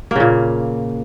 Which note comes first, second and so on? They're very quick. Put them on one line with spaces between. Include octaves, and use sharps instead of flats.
A#3 C#3 A#2